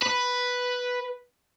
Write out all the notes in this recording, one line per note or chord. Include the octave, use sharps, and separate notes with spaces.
B4